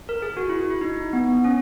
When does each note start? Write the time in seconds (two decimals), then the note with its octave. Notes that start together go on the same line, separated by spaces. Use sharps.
0.09 A#4
0.22 G#4
0.37 F#4
0.49 E4
0.70 E4
0.81 D#4
1.13 B3
1.44 C#4